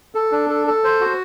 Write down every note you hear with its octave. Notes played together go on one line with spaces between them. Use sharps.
A4
D4
A4
A4
C5
F#4